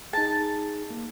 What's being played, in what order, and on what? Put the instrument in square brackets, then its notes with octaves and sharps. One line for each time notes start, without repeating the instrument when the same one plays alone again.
[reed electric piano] D#4 G#4 [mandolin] A5
[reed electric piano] A#3